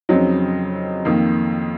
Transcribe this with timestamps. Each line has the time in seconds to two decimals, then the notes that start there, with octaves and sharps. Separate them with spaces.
0.09 F2 C#3 F#3 C4 D#4
1.05 F2 D#3 A#3